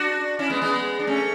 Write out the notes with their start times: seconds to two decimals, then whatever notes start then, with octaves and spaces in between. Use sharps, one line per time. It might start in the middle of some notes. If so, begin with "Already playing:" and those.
Already playing: D4 F#4
0.39 C#4 E4
0.50 G#3 B3
0.62 G#3 B3
0.99 D4
1.07 A3 C#4